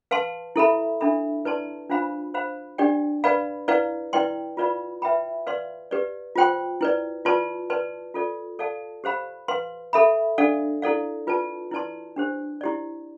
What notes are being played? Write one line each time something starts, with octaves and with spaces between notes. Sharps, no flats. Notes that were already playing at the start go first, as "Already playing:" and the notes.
B4 F5 A5 C6
E4 A4 E5 B5
D4 A4 E5 B5
E4 B4 D5 A5 C6
D4 F4 C5 F5 B5
C5 F5 B5
D4 G4 D5 G5
B4 D5 F5 B5
E4 B4 D5 F5
E4 B4 D5 G5 C6
F4 B4 D5 F5 B5
B4 E5 G5 B5
B4 D5 F5 C6
G4 B4 D5
F4 C5 G5 C6
E4 B4 D5
F4 B4 D5 A5 C6
B4 D5 A5 C6
F4 A4 D5
A4 D5 F5 A5
G4 C5 F5 B5
B4 F5 C6
A4 E5 B5
D4 A4 D5 F5
E4 A4 D5 F5
F4 B4 D5 A5
E4 B4 D5 A5 C6
D4 G4 C5
E4 G4 D5